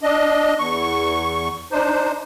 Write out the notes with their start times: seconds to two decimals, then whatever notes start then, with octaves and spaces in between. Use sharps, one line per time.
0.03 D4 D#5
0.58 E2 C#6
1.72 D4 D#4 C5